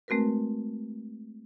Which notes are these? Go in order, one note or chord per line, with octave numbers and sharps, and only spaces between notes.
G#3 A3 C4 F#4 A#4 B4